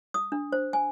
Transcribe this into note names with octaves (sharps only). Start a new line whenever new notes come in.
D#6
D4
C5
G#5